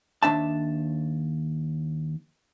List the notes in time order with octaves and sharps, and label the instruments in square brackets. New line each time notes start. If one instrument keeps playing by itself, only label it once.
[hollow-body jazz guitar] D#2 D4 E5 A5